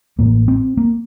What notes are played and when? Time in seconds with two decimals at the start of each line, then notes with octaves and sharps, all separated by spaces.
0.19 A1 A2 A#3
0.48 C4
0.77 A#3